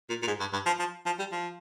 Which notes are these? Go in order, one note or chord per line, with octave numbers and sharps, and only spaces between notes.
A#2
A#2
G#2
G2
G2
F3
F3
F3
G3
F3